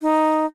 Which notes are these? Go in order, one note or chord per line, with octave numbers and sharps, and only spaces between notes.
D#4